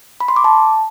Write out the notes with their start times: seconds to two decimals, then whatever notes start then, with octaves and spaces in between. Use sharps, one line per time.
0.21 B5
0.28 C6
0.36 D6
0.44 A5